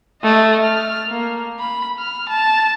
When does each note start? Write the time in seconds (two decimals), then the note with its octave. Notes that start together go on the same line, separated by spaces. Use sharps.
0.22 A3 D#5
0.62 F6
1.09 A#3
1.59 B5
1.99 F6
2.29 A5